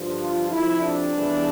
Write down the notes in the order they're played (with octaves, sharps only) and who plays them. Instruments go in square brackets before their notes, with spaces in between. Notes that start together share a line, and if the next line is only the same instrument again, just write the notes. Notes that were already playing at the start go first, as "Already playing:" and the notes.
Already playing: [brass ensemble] G2 D3 F3
F4
F2 C3 F3 E4
D4
E2 E3 G3